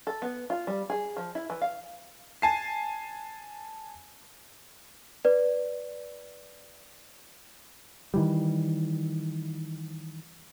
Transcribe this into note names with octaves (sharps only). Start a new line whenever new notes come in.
A4
B3
F4
G3
G#4
F3
E4
E3
F5
G#5 A5 C7
B4 D5
D#3 E3 G3